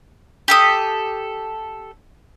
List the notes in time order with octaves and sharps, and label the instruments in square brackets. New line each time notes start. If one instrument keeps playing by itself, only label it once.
[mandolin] G4 A4 D#6